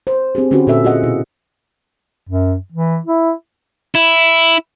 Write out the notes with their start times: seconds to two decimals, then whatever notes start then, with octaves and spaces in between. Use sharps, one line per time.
0.07 C5
0.35 C4 D4 G4 G#4
0.51 D3 C#4 D4 F4 F#4 B4
0.67 A#2 F#4 A4 E5
0.84 F4 F#4 G#4 D#5 F#5
1.03 B2 E4
2.29 F#2
2.72 E3
3.06 E4
3.95 E4